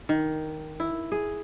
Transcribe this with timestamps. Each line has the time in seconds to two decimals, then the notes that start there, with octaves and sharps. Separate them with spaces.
0.09 D#3
0.80 E4
1.12 G#4